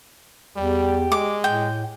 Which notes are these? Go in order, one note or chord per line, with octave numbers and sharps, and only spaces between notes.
E2 G3 G4
G#3 D6
A2 G5